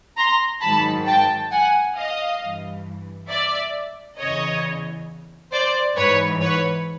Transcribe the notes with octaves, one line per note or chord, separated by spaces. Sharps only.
A#5 C6
G#2 D#3 F#3 A5 B5
G5 A5
F#5 G#5
D#5 F5
G2 E3
D5 E5
E2 C#3 E3 C#5 D#5
C5 D5
G#2 E3 B4 C#5
B4 C#5